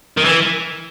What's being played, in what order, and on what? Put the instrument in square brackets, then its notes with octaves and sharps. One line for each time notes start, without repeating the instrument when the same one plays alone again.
[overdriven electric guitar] D#3
E3